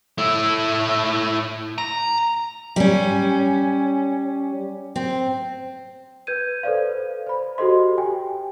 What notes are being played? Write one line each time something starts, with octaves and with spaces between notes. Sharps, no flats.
A2 E4
A#5
G3 C#4
C4
B4 G6 G#6 D#7
A4 B4 C5 D5 F5
C5 B5
F#4 G4 A4 C5 D#5 C6
G4 G5 G#5